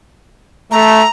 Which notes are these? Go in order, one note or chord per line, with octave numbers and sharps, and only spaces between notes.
A3 A#5